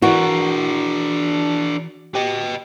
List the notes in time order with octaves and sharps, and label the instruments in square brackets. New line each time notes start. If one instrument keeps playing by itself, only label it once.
[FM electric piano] E3 [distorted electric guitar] D4 A#4 [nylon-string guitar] F#4
[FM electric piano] G4 [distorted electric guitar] B4 D#5